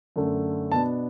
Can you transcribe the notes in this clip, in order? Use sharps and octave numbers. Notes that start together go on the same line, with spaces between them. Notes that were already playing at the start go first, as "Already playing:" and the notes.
F#2 D3 A3
B2 B3 D4 A5